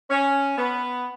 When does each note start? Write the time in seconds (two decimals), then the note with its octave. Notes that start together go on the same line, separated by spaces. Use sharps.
0.10 C#4
0.57 B3